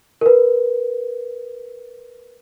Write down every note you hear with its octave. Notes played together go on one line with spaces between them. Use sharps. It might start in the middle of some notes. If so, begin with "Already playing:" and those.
A#4 B4